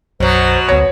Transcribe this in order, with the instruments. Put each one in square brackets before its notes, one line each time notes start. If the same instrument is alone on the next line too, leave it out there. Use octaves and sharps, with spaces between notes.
[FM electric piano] B1 F#2 [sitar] B2 F#3 [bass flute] C5
[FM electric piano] D2 A#6 [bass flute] B3 [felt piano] C#5